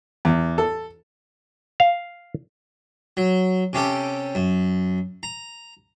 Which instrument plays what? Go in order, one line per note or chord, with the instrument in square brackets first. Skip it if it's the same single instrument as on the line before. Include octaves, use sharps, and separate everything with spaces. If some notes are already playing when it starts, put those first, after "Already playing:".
[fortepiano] E2
A4
[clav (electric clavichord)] F5
[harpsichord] F#3
C3 C#4 G4 A4
F#2
A#5